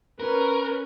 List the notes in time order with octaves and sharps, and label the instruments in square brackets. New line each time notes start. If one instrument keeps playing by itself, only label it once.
[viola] C#4 B4 [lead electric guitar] A#4